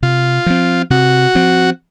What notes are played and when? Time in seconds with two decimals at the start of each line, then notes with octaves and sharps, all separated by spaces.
0.02 C3 F4
0.46 F3 C4
0.90 C3 F#4
1.35 F3 C4